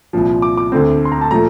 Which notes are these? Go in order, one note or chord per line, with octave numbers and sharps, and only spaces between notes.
C2 A#2 F3
D6
D6
D2 D3 A3 C4
C6
A#5
A5
A#2 F3 A3 A#5